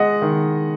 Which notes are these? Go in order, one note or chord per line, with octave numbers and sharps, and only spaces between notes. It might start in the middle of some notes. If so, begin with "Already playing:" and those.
Already playing: G#3 D#5 F#5
D#3